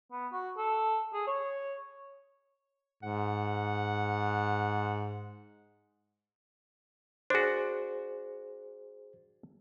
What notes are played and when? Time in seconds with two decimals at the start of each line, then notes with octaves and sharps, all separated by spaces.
0.12 B3
0.33 F#4
0.58 A4
1.14 G#4
1.27 C#5
3.03 G#2 F#5
7.30 D4 F#4 G#4 C5